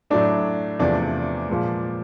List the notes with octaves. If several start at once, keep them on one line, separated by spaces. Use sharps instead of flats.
A2 F#3 A3 D4 D5
E2 C3 F3 A3 D4 D5
A#2 F3 G#3